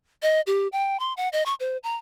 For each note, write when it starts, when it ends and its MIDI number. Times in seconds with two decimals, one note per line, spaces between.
0.23 0.41 75
0.47 0.68 67
0.72 0.99 79
1.00 1.13 84
1.17 1.29 78
1.33 1.43 75
1.46 1.54 85
1.60 1.77 72
1.83 1.95 82